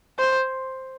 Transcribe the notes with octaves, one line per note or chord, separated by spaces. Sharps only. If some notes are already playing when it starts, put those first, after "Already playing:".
C5